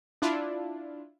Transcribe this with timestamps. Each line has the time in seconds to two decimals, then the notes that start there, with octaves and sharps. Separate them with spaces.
0.22 D4 E4 F4